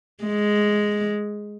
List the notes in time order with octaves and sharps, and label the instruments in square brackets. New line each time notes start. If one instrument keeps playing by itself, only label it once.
[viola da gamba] G#3